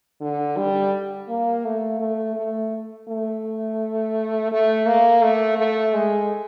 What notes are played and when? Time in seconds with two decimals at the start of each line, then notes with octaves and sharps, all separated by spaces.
0.21 D3
0.57 G3
1.29 A#3
1.65 A3
2.00 A3
2.36 A3
3.08 A3
4.52 A3
4.87 A#3
5.23 A3
5.58 A3
5.94 G#3